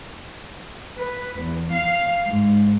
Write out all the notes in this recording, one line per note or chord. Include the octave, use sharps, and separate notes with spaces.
B4
E2
F5
G#2